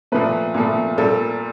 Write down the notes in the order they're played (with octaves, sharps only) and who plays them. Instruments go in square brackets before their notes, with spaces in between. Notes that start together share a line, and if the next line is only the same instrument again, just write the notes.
[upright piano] A#2 F3 A3 B4
A#2 F3 A3
A#2 G3 A#3 A4